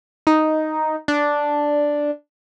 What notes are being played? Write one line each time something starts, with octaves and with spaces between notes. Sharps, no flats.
D#4
D4